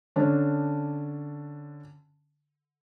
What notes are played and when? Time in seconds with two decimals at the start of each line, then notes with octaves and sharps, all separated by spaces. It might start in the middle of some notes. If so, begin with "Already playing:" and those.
0.16 D3 C#4 D4